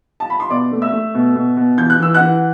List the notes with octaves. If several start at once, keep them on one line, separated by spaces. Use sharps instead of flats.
A5
B5
C6
B2 D5 D6
A3
E5 E6
A3
B2
B2
B2
E3 G6
F#6
E3 E6
F#5 F#6
E3